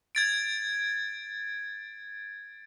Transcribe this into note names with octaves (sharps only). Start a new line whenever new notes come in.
G#6 A6 D7